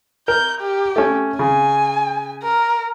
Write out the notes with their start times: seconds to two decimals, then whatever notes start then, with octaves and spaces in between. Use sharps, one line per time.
0.28 A#4 G6
0.61 G4
0.96 A3 C#4
1.39 C#3 G#5
2.42 A#4